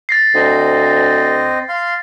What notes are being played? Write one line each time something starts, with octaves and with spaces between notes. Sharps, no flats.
A6 A#6 C7
D2 C4 D#5
F5 C6